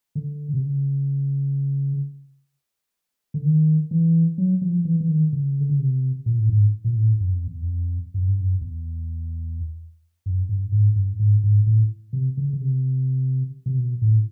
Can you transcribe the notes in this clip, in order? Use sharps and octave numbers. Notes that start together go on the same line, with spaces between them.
D3
C3
C#3
D3
D#3
E3
F#3
F3
E3
E3
D#3
C#3
D3
C#3
C3
A#2
A2
G#2
A#2
A2
F#2
F2
E2
F2
F#2
G2
F#2
E2
F#2
G2
G#2
G2
G#2
G#2
A2
C3
C#3
C#3
C3
C3
B2
A2